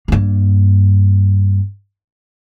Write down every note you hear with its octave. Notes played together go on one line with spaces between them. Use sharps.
G2 A#3